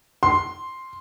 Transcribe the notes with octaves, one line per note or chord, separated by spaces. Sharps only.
C6